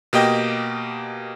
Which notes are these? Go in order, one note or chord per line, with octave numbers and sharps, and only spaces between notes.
B2 A#3 G4 D#5 G5